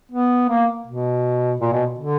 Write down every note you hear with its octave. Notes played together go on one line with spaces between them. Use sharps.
B3
A#3
B2
A#2
B2
D3